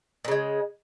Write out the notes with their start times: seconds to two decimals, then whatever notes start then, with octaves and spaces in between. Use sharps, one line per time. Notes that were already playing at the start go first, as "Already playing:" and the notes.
0.25 A#2
0.28 C#3
0.31 G#3